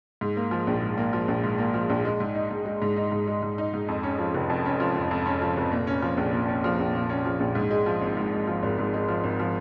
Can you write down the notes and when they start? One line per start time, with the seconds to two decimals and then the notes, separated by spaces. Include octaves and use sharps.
0.21 G#2
0.37 A#3
0.51 F3
0.67 A#1
0.82 G#2
0.98 A#3
1.13 F3
1.28 A#1
1.44 G#2
1.58 A#3
1.74 F3
1.90 A#1
2.05 G#3
2.20 G#2
2.35 D#4
2.51 G#2
2.66 G#3
2.82 G#2
2.97 D#4
3.12 G#2
3.27 G#3
3.42 G#2
3.58 D#4
3.74 G#2
3.88 F2
4.03 C#4
4.19 F3
4.34 F1
4.50 F2
4.65 C#4
4.80 F3
4.96 F1
5.11 F2
5.26 C#4
5.42 F3
5.57 F1
5.72 A#2
5.87 C#4
6.02 F3
6.17 A#1
6.33 A#2
6.49 C#4
6.64 F3
6.80 A#1
6.95 A#2
7.09 C#4
7.25 F3
7.40 A#1
7.55 G#2
7.71 G#3
7.86 F3
8.01 G#1
8.17 G#2
8.32 G#3
8.48 F3
8.63 G#1
8.78 G#2
8.94 G#3
9.08 F3
9.24 G#1
9.40 F3